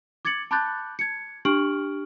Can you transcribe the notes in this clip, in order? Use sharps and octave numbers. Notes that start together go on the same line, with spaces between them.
D6 G#6 A6 C#7 F#7
A5 B5 D6 F#6 G6 A6
G#6 C#7
D4 G4 C#6 F6 D7 F#7